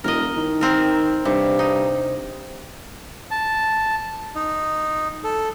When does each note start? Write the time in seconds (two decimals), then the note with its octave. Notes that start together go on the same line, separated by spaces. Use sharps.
0.04 E1 A#4 D#5
0.37 D#3
0.61 C4 A#4
1.25 G2 C3
1.59 D#4
3.31 A5
4.35 D#4
5.24 A4